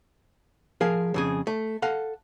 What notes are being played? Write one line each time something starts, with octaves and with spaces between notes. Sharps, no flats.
F3 G#4 A#4 F5
F2 C#3 G#4
A3
A4 F5 F#5